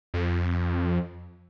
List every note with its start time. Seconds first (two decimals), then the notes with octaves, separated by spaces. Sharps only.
0.14 F2